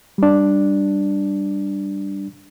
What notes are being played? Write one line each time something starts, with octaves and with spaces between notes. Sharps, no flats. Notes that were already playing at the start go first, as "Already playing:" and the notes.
G3 D4